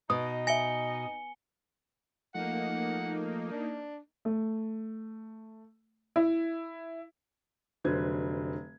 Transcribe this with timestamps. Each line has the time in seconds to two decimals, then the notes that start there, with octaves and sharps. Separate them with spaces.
0.10 B2 D#4 D#5 D#6
0.47 E5 G#5 A#6 C#7 G7
2.35 F3 A3 A#3 D#4 F#5
3.51 D4
4.25 A3
6.16 E4
7.84 F1 D3 F#3 B4 C5 G#6